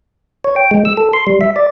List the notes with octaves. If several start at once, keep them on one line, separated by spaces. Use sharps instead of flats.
C#5
G5
G#3
E6
A4
C6
G3
E5
D5